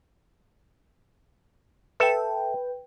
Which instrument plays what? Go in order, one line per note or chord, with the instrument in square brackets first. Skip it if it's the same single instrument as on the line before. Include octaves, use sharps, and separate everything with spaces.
[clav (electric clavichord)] A4 E5 A5 [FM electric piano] B4 G5